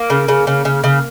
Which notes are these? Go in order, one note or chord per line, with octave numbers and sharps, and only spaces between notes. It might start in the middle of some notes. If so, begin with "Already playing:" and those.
Already playing: A#3
C#3
C#3
C#3
C#3
C#3